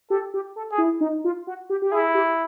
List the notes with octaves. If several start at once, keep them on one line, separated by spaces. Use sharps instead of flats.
G4 A4
G4
A4
G#4
E4
D#4
F4
F#4
G4
G4
E4 G#4
G4